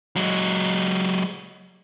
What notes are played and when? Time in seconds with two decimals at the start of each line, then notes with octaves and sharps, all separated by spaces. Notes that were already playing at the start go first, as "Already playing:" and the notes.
0.16 F#3 G#3